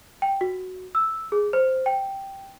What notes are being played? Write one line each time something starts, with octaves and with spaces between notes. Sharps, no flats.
G5
F#4
E6
G#4
C5
G5